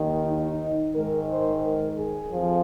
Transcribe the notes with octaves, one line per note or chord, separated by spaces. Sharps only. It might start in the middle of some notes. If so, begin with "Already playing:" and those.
Already playing: D#2 D#3
D#4
G#2 D#3 A#4
C5
A#4
G#4
F2 F3